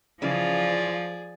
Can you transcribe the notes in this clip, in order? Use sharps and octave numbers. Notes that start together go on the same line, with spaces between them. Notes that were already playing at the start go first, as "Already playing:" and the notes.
C#3 E3 F3 C#4 F4 G#4 D5